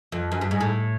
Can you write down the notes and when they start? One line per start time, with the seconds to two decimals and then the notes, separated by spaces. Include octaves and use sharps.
0.12 F2
0.32 F#2
0.41 G2
0.51 G#2
0.61 A2